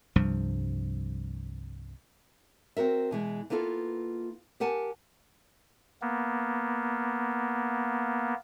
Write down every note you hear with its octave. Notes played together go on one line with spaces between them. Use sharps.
C2 G2 F3
C4 F#4 A#4 E5
B2 E3 G#3
A#3 B3 E4 F4 A4
G4 A#4 F#5 G#5 A5
A#3 B3